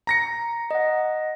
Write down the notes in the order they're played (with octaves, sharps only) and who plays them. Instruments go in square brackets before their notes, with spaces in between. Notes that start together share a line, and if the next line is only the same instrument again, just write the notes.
[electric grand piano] A#5 A#6 C#7
[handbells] D#5 F#5